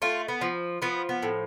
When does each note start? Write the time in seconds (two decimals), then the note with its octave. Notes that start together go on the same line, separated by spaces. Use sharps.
0.02 A3 F4
0.28 B3
0.41 F3
0.82 F3 B3
1.09 B3
1.23 A2